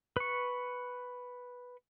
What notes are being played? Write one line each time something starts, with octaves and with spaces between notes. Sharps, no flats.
B4 C#6